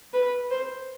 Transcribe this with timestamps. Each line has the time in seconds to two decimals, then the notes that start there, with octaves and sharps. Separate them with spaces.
0.13 B4
0.50 C5